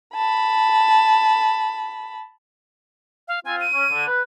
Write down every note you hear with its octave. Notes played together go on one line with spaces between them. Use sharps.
A5 B5
F5
C4 F4 G#5
D#7
C#4
D3
B4